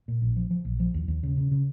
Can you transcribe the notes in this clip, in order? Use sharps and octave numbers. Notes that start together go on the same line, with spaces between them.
A#2
A#1
F3
F3
A#1
F3
D#2
D#2
C#3
C#3
C#3